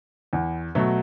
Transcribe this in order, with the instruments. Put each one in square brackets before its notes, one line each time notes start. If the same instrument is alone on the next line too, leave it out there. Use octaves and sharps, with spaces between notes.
[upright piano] E2
B2 F#3 A3